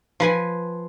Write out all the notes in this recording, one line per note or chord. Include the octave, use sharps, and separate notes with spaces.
F3 B4 G#5